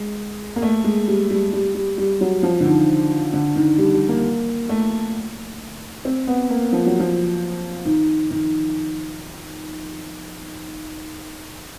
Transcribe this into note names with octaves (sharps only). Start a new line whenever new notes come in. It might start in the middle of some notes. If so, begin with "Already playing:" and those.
Already playing: G#3
A#3
A3
G#3
G3
G3
G3
G3
G3
F#3
F3
D3
D#3
D3
D#3
G3
G3
A#3
A3
C4
B3
A#3
F3
F#3
F3
D#3
D#3